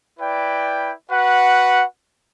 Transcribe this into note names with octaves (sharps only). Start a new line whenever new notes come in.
E4 B4 D5 G5
F#4 B4 F#5